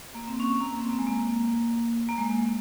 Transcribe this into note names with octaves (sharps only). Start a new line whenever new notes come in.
A#3
C4
C#4
A#3
C4
A#3
G#3
A#3
A#3
G#3